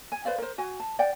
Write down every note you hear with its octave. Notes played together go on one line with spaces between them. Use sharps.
G#5
B4 C5 D5 F5
A#4 C5
F#4 G#5
A5
D5 F#5 G5